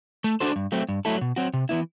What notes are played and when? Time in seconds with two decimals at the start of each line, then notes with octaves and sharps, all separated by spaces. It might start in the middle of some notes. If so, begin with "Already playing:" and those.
0.24 A3
0.40 D4 F#4 A4 C5
0.56 G2
0.72 F#3 A3 C4
0.89 G2
1.05 F#3 A3 E4 A4
1.21 B2
1.36 F#3 C4 F#4
1.54 C3
1.69 E3 B3 E4